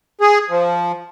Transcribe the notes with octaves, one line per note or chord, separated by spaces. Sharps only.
G#4
F3